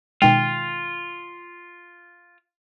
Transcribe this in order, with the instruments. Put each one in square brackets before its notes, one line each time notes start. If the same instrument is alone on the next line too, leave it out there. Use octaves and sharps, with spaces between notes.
[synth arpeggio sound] B2 D#3 G#3 [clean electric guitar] F4 [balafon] G5